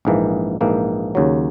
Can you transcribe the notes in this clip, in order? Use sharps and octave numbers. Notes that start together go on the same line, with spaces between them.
A#1 G#2 E3 A#3
A#1 G#2 E3 A#3
D#2 C#3 F#3